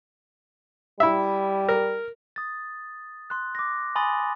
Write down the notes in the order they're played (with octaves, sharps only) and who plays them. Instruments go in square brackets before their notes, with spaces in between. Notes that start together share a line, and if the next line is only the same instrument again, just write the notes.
[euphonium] G3 [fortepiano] E4 E5
[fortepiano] A#4
[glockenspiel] D#6 A6
C6 F#6
D6 A#6
G#5 B5 C6 D#6 A6